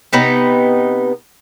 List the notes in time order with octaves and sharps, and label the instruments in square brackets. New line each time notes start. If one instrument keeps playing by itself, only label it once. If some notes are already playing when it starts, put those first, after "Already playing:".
[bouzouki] C3 B3 D#4 B4